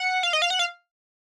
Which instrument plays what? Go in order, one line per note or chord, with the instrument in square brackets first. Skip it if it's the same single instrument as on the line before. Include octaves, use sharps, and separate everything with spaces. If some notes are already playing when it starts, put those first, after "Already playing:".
Already playing: [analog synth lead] F#5
F5
D#5
F5
F#5
F5